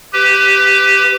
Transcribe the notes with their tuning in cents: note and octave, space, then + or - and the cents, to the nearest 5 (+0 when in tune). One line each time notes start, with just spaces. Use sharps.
G4 +0 B4 +25